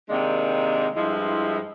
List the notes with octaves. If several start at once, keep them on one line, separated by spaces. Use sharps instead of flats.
C3 D#3 G#3 A#3 D4
G2 F3 G#3 E4